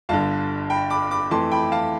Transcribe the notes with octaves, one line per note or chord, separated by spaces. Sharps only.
G1 G2 D3 F5 A5
G5 B5
B5 D6
B5 D6
F2 E3 A3 A5 C6
G5 B5
F5 A5